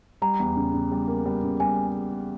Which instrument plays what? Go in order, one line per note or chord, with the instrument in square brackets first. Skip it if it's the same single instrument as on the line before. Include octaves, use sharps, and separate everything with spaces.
[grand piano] G3 [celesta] A#5
[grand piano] E2
C#3
C#3
G3
A#3
G3
C#3
[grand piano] G3 [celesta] G#5